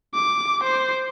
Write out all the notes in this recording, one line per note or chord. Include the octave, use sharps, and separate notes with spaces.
D6
C5